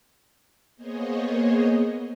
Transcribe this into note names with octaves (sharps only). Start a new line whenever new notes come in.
A#3 B3 G#4 C5 C#5 D#5